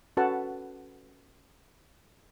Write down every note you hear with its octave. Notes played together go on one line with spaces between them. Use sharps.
C#4 F#4 A4 B4 F#5 A5